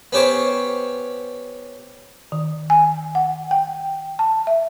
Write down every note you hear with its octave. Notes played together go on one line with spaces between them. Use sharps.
B3 C#4 G4 C5 C#5
D#3
G#5
F#5
G5
A5
E5